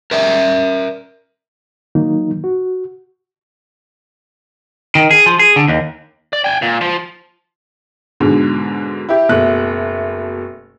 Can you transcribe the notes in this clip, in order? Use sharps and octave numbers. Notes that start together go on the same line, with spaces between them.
A#4 D5 E5
D#3 F#3 A#3 D#4
F#4
D#3
G#4
F3
G#4
D3
D#2
D5
G5 G#5
A#2
F3
G#2 B2 D3
E4 G4
F#1 B2 A3 F#6